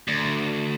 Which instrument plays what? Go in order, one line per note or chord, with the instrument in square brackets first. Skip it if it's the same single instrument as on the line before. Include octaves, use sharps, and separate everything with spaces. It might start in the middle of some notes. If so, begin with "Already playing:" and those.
[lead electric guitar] D2